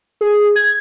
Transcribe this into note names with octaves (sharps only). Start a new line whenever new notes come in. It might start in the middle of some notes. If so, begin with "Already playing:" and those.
G#4
G#6